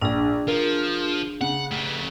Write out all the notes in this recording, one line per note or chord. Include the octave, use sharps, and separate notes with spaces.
A#1 D4 G#4
F3 A#4
C#3 F#5
A3 G4